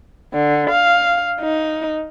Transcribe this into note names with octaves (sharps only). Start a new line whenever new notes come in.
D3
F5
D#4